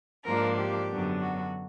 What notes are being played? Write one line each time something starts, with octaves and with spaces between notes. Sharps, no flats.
G#2 F3 A#3 D4 A#4
G4
F#2 D3 F#3 B3 D4
F#4